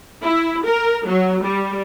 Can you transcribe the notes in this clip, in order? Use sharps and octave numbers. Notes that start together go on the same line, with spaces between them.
E4
A#4
F#3
G3